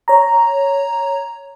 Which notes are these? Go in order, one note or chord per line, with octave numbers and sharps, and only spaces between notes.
C#5 A#5